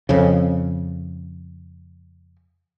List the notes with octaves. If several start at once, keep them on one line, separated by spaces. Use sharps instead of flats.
F2 C#3